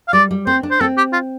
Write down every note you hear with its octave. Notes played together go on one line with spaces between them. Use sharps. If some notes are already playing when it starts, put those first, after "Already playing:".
F5
G3 D5
G3
C4 C5
D4
C5
C4 A4
G4
F4